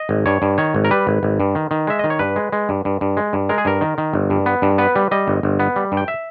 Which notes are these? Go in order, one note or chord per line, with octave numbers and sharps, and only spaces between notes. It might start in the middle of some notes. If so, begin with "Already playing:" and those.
Already playing: D#5
G#1
G2 C#5
G2
D#3 C#5
G#1
A#4
G3 B4
G#1
G#1
G2
D#3
D#3
G#3 E5
D#3 D#5
C#5
G2 B4
G#3
G#3
G2
G2
G2
G#3
G2
G#3 A#4
G#4
G2 A#4
D#3
D#3
G1
G2
B3
G2
B3 B4
G3
G3 D#5
G1
G1
B3
G3
G2
G5
E5